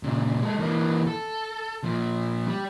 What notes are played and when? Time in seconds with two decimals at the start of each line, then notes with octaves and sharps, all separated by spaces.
0.03 A#2 C#3
0.42 G#3 A4
0.59 E3 A#3
1.07 A4
1.83 A#2 F3
2.47 G3